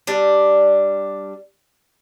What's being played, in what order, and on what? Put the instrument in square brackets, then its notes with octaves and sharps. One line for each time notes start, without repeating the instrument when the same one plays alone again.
[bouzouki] G3 D4